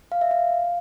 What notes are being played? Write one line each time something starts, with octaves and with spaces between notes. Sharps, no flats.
F5
E5
F5